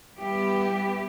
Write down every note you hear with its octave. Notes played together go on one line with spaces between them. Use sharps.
G3 B3 E4 G4